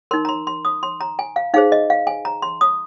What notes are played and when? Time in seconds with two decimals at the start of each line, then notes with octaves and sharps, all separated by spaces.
0.11 D#4 A#4 C6
0.25 A#5
0.29 C6
0.47 C6
0.65 D#6
0.83 C6
1.01 A#5
1.19 G#5
1.36 F5
1.54 D#4 G#4 C5 F5
1.72 D#5
1.90 F5
2.07 G#5
2.25 A#5
2.42 C6
2.61 D#6